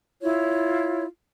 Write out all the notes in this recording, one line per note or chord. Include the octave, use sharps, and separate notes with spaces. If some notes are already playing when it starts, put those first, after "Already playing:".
E4 F4 C#5